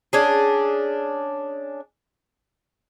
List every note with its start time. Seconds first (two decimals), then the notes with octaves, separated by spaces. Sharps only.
0.13 C#4 D4 G#4